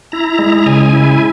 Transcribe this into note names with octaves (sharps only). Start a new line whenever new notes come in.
E4 A#5
G#3
C#3 G#5
E4